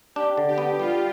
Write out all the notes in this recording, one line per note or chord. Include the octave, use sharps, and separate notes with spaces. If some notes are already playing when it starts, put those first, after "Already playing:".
D4 G4
D3
G4
B3
G3 F4